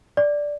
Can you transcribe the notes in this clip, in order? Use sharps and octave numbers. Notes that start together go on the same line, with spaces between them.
D5